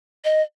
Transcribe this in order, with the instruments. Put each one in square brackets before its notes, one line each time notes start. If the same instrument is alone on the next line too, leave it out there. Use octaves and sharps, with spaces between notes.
[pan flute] D#5